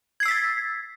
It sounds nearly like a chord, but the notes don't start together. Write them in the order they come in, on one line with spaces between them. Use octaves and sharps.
G#6 C7 E6 B6 A6